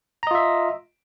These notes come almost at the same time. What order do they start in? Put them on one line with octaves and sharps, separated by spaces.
A#5 D#5 F4 E5